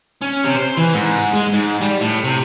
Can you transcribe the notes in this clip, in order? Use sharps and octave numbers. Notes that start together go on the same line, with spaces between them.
C#4
C3
C5
E3
G#2
G#3
G#2
G3
A2
C3